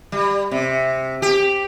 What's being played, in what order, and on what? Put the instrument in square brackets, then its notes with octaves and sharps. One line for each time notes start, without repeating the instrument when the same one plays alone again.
[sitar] G3
C3
G4